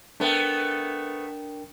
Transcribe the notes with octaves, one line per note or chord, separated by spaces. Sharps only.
A3 B3 D4 A#4 G5